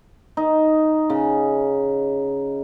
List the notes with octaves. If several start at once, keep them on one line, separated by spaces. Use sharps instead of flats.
D#4
C#3